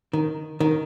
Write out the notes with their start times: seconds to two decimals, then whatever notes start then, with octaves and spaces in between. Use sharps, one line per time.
0.13 D#3
0.60 D#3